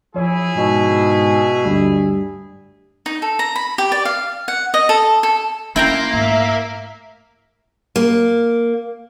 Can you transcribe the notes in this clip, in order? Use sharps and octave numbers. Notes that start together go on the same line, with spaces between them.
F3 E4 G#4 C#5 G#5
G#2 B2
D2 G2
D#4
A4
A#5
B5
G4
D5
F5
F#5
D#5
A4
A4
A#3 C#4 E4 G5 A#5 C6
G#2 A3 E5
A#3